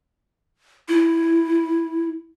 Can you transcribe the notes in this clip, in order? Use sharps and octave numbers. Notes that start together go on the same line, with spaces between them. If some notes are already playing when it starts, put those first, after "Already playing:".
E4